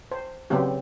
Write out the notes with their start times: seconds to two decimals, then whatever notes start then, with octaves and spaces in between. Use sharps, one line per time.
0.11 C5
0.50 C#3 F#3 B3 C4 G4